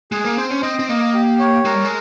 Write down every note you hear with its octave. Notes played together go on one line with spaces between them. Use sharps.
G#3 G#4
A#3
C4 C5
C#4
C4 D#5
C4
A#3 D#5
G4
C#5
G#3 A#4
G3
G#3